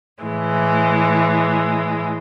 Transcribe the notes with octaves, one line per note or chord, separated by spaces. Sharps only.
A2 E3 G#3